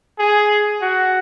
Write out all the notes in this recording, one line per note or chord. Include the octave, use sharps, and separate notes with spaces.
G#4
F#4